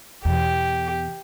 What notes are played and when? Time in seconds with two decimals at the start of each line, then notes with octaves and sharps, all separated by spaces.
0.25 E2 B2 G4